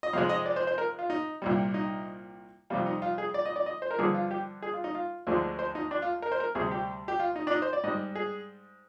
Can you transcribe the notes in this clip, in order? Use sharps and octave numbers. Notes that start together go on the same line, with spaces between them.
D#5
F2 C3 F3 G#3 F5
D#5
D5
C5
C5
A#4
F4
D#4
C2 A#2 G3
D#4
F2 C3 G3 F4
D#4
F4
G#4
D5
D#5
D5
D#5
C5
A#4
G2 D3 F3 G#4
F4
G4
G#4
F4
D#4
F4
D2 D3 F3 G#3
C5
D#4
D4
F4
A#4
C5
A#4
D2 C3 G3 G#4
G4
G4
F4
D#4
D4
D#4
C5
D5
G#2 G3 D#5
G#4